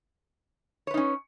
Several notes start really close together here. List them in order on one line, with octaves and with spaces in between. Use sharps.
C#5 B4 D#4 C#4